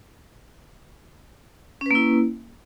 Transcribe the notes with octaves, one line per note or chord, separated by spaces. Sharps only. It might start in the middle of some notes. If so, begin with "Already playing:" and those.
A#3 C#4 E4 B4